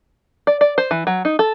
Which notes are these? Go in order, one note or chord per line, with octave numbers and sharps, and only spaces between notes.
D5
D5
C5
E3
F#3
D#4
A4